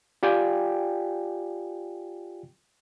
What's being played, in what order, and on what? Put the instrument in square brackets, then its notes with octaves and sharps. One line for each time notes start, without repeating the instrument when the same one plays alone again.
[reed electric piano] F4 G4 D5 G5 G#5